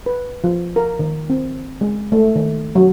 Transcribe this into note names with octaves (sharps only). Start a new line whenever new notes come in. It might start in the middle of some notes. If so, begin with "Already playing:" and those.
B4
F3
A#4
D#3
C4
G#3
A3
D#3
F#3